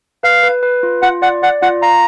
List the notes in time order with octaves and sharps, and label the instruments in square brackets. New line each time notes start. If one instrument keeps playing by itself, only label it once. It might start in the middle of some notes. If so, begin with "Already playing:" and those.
[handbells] B4 [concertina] F5
[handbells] B4
B4
F4
[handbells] F4 [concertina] F#5
[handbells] D5 [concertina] F#5
[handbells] D5 [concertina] F#5
[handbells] F4 [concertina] F#5
[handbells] F5 [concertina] A#5